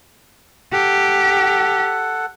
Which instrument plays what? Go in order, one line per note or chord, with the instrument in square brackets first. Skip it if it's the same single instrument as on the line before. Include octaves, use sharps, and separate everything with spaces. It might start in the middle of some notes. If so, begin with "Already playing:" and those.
[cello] G4 [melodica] A4 F#5